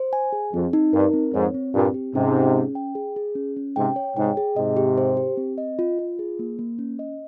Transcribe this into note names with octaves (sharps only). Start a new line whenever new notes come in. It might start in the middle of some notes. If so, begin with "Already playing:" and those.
Already playing: C5
G#5
G#4
F2 C4
D#4
G2 A#4
C4
F2 G#2 C#5
C4
G2 A#2 C4
G4
G#2 C3 C#4
G#4
C#4
G5
G#4
G#4
C#4
C#4
G#2 C3 G5
C#5
G#2 C3 G5
G#4
G#2 C3 D#5
G4
C5
G4
C4
D#5
F4
F4
G#4
A#3
A#3
C#4
D#5